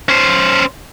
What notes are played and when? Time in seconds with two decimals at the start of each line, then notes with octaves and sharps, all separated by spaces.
0.09 C#4 C5